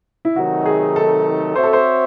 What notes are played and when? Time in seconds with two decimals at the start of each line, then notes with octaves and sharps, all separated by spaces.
0.25 E4
0.36 C3 D#3 F#3 A3 D#4 F#4
0.66 G#4
0.96 A4
1.55 C4 F#4 C5 C#5 E5
1.64 A4
1.73 C5